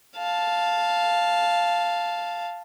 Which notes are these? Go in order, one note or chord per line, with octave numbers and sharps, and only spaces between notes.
F5 A5